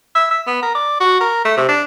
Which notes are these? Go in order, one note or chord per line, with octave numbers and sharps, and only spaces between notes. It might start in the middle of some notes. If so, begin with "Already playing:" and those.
E5
E5
B3
A#4
D5
F#4
A#4
A3
C3
D4